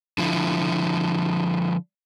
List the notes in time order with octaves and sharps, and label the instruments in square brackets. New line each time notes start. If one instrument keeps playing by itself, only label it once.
[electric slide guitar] D3 F3 E4